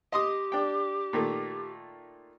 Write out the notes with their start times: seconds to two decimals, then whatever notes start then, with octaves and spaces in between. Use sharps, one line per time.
0.12 G4 D#5 C6 D#6
0.52 D4 G5
1.13 A#2 D#3 A3